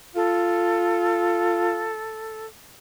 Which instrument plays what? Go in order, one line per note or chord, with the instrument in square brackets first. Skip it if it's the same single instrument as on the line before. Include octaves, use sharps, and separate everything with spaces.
[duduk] F4 [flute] A4